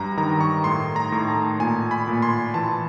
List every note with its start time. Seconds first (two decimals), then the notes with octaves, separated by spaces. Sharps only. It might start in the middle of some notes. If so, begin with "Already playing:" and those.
Already playing: G2 F#3 A#5
0.17 D#3 A#5
0.41 C#6
0.64 A2 C6
0.96 A#5
1.12 A2
1.28 A5
1.59 A#2 G#5
1.91 B5
2.08 A#2
2.22 C6
2.54 E3 A5